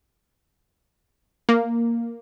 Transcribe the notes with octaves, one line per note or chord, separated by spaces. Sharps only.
A#3